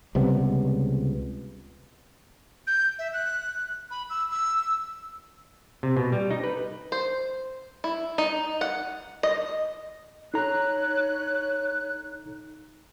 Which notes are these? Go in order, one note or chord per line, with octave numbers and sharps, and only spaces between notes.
C#2 C3 G3 B3
G6
E5
F#6
B5
E6
E6
C3
B2
G3
D#4
B4
C5
E4
D#4
F#5
D#5
D#4 A4 C#5 A#5 F#6